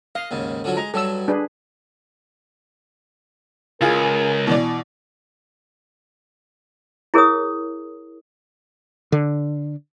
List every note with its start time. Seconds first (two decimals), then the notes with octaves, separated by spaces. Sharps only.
0.15 D#5 F5
0.31 D#2 G#2 C#3
0.64 D3 F3 F#3
0.77 G#3 A#5
0.94 G2 F#3 A4 E6
1.28 D4 G#4 B4
3.81 C#2 F4 G#4 A#4
4.47 B2 E3 D5
7.14 E4 G#4 A#4 C#5 D#6
9.12 D3